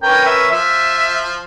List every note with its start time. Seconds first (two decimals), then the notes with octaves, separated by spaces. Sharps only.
0.02 C#4 A#4 B4 G5
0.26 E5
0.51 F3 E5